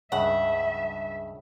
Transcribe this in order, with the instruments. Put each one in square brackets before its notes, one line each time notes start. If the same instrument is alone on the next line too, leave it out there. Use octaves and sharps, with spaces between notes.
[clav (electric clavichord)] C#2 G2 C#3 [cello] E5 [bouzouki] F#5